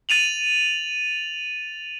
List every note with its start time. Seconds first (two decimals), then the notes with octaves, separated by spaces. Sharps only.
0.09 A6 D#7 F7 F#7